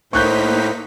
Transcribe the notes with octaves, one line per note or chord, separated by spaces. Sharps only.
A2 A#3 D#4 C5 C#6 F#6 G6 B6